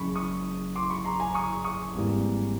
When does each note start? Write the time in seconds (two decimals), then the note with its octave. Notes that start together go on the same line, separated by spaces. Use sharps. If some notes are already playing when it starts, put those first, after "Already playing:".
Already playing: F#1 F#2 C#3 B5 C#6
0.15 C#6 D#6
0.76 C6 D6
0.90 B5 C#6
1.05 A#5 C6
1.20 G#5 A#5
1.34 C#6 D#6
1.64 C#6 D#6
1.94 G#1 G#2 E3 G3 A#3